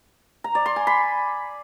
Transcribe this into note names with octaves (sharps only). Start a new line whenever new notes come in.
A#5
D5
C6
G#5
B5